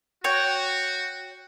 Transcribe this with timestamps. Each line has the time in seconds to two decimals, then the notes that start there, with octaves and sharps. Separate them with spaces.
0.24 F#4 C#5 G5